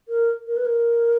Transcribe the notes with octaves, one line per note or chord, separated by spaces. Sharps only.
A#4
A#4
B4
A#4